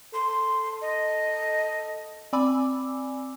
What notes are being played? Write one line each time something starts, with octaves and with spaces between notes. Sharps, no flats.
A4 C6
D#5
C4 D5 G#5 B5 D6 E6